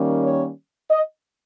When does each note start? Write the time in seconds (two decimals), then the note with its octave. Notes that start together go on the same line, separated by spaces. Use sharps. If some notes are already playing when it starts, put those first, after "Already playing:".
Already playing: D#3 G3 A#3 C#4
0.23 C#5
0.90 D#5